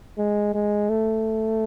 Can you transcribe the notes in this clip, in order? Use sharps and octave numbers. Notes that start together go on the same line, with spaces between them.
G#3
G#3
A3